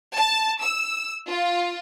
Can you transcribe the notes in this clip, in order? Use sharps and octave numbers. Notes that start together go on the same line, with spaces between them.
A5
E6
F4